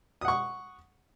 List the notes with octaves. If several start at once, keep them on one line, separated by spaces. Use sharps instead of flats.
F#5 C#6 D#6